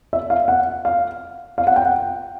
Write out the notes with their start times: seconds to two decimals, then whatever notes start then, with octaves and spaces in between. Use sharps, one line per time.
0.13 E5
0.30 F5
0.48 F#5
0.85 F5
1.58 F5
1.67 F#5
1.76 G5
1.85 F#5